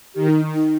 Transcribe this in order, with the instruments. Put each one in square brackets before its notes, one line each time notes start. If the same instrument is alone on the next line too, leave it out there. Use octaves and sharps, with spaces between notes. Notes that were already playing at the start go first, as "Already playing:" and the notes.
[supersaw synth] D#3 [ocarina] G4
[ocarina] D#4
D#4